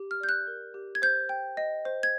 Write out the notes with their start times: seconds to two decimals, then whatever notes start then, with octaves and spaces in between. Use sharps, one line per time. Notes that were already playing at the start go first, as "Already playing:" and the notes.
Already playing: G4
0.11 F6
0.20 D5 G6
0.29 F#6
0.47 A#4
0.74 G4
0.95 G#6
1.02 C5 G6
1.29 G5
1.57 D#5
1.85 C5
2.03 G#6